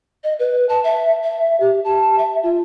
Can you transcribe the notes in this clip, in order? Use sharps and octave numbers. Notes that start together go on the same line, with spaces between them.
D#5
B4
A5
E5
E5
G4
A5
E5
F4